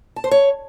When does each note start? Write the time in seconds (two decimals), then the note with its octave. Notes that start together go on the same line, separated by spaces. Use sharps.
0.16 A5
0.24 C5
0.31 C#5